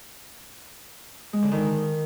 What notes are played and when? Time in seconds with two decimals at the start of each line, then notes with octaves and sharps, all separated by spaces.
1.33 G#3
1.42 D3
1.52 D#3